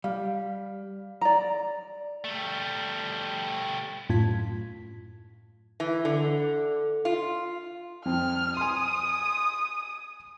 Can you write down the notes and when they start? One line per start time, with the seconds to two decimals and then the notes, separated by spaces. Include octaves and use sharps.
0.04 G3 F5
1.21 D5 A#5
2.24 G3 A3
4.10 F#2 A2 F4 A5 G#6 B6
5.80 E3
6.05 D3
7.05 F4
8.05 F2 C4 F6
8.57 G#5 C6 D#6